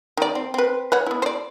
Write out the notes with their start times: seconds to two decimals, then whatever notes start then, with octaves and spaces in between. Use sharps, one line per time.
0.17 D#3 D5
0.35 C4
0.54 C4 B4
0.92 B4 C#5 F#5
1.06 B3 E4
1.22 C5 D5